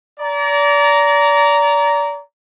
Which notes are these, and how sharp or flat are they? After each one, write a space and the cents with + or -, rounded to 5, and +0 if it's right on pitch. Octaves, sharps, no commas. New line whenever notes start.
D5 -30 A#5 +0